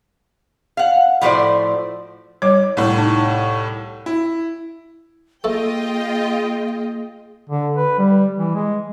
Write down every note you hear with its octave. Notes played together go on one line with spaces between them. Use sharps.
F5 F#5
A2 F3 A3 F#4 C5 D5
G3 C#5 D6
C2 A2
D#4
E4
A3 A#3 F4 G#4 A4 D#5 G5
D3
B4
G3
E3
G#3